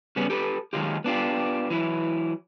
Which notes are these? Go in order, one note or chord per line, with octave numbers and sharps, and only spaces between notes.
C#3 G3 B3 C#4
G4 A4 B4
D#3 E3 F#3 G#3 F4 G4
B3 D4 F4 G4
E3 F#3 E4